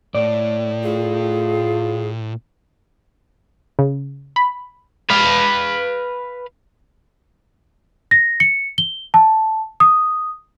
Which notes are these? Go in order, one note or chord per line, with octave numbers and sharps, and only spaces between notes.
A2 D5
F4 G#4
C#3
B5
B4 F5
A#6
C#7
G7
A5
D#6